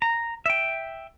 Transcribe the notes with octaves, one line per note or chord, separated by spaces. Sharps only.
A#5
E5 G5